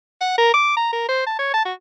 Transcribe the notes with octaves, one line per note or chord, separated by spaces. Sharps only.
F#5
A#4
D6
A#5
A#4
C5
A5
C#5
A5
F#4